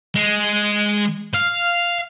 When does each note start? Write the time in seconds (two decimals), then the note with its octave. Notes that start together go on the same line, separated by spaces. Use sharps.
0.15 G#3
1.34 F5